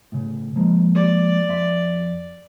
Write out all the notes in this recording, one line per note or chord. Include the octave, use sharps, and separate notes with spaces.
A2 C#3
F3 G#3 A#3
D5
F2 E5 C6